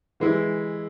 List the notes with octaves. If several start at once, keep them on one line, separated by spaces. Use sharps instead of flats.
E3 G#3 E4